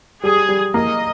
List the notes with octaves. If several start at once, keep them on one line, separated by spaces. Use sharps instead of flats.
G3 G#4
G3
A#3 D#5